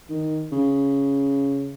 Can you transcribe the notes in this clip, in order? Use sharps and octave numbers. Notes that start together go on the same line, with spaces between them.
D#3
C#3